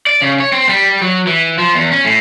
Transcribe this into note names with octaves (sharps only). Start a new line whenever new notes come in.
D5
C#3
C#5
C4
G3
F#3
E3
F3
E2
C#4
A2